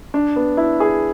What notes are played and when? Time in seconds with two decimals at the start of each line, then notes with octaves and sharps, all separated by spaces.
0.14 D4
0.36 B3
0.57 E4
0.80 G#4